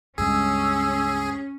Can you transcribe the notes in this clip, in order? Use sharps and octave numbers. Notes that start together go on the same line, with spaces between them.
C#2 G2 G#3 C#4 G#4 E6